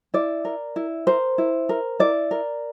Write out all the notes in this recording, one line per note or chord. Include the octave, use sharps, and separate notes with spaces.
E4 D5
A#4
E4
A#4 C5
E4
A#4
E4 D5
A#4